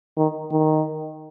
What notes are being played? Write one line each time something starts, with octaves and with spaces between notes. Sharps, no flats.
D#3
D#3